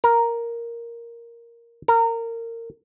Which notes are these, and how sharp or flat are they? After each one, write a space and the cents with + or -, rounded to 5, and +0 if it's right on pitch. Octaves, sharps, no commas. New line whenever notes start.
A#4 +0
A#4 -25